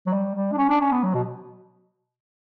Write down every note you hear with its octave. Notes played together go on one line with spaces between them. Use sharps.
F#3
G3
G3
D4
C#4
D4
C#4
B3
F#3
B2